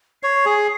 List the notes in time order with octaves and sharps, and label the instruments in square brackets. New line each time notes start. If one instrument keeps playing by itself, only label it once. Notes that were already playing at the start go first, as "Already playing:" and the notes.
[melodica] C#5 [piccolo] C7
[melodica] G#4